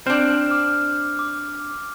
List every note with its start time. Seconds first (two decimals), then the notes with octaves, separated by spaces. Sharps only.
0.07 C4 D4 F6 G6 E7
0.50 D6 F6
1.19 D6